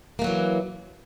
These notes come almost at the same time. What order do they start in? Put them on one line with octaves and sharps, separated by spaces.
A#3 A3 F#3 E3